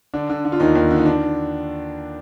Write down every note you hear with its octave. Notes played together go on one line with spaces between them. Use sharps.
D3 D4
D3
D3
F4
D#2 D#4
D#2
D3
D#4
D#3 D4